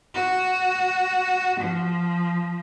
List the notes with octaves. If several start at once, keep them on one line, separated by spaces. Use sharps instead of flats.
F#4
F3